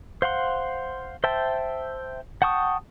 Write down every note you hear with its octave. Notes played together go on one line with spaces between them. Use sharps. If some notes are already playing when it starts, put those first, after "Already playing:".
C5 F5 F#5 C6
C5 E5 G5 A5
F#5 G5 A5 C#6 D#6